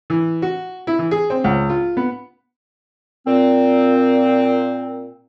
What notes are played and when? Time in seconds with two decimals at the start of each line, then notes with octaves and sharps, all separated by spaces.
0.10 E3
0.42 F#4
0.87 E4
0.99 E3
1.11 G#4
1.30 C4
1.44 C#2
1.69 F4
1.97 B3
3.27 A#2 C4